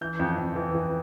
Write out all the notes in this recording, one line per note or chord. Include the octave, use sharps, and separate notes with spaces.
E3 G6
F2
F2
E3
E3